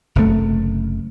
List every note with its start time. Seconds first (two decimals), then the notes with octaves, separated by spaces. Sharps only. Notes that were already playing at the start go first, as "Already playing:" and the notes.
0.16 F#1 C3 A3